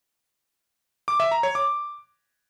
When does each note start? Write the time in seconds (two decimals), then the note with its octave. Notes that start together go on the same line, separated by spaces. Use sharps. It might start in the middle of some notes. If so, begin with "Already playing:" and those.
1.08 D6
1.20 E5
1.31 A#5
1.43 C#5
1.55 D6